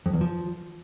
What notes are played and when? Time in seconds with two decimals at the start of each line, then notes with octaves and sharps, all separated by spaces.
0.06 F2
0.13 E2
0.21 F3